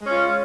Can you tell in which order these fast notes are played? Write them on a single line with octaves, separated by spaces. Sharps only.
G#3 C#4 F4